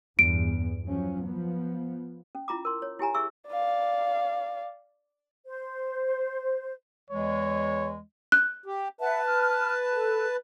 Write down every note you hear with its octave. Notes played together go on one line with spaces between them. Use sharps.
E2 G2 D7
F3 F#3 C#4
F3 B3
C#4
E4 F4 A#5 D6
A#4 C6
C#5
E4 G4 G#5 A#5
G#4 E5 C#6 E6
D5 F5
C5
E2 E3 G#3 C#5
F#6
G4
B4 E5 F#5 A5
F6
A4